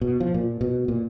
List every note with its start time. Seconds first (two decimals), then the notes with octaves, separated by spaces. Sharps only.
0.01 B2
0.20 F3
0.34 A#2
0.61 B2
0.88 A#2